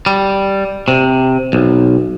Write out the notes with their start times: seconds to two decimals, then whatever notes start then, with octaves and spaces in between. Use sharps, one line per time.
0.06 G3
0.88 C3
1.53 B1